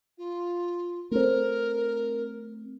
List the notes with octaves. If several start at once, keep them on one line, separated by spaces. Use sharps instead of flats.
F4
A3 C4 A#4